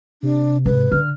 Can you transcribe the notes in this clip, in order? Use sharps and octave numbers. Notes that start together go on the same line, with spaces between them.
C3 D4
G#2 B4
D3 F6